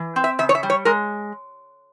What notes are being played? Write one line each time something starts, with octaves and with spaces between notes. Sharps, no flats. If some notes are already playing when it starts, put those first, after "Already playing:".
Already playing: E3
C4
E5
C#3 E5
C#5
E5
G3
C#5
G#3 A#4